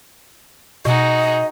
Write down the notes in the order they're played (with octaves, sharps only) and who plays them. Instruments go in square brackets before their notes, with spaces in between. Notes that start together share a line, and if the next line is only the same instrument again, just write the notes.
[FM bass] B2 [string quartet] D#4 F#4 G#4 [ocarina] D#5